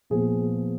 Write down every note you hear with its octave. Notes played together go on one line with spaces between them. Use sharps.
A#2 F3 B3 G#4